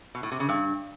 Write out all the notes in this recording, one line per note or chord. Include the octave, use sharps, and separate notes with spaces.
B2
A2
C3
C#3
G2